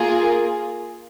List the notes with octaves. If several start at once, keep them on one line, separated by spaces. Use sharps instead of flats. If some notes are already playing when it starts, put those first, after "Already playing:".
Already playing: A#3 F4 G#4